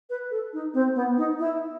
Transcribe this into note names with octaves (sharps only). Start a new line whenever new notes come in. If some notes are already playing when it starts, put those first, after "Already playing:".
B4
A4
D#4
C4
B3
D#4
E4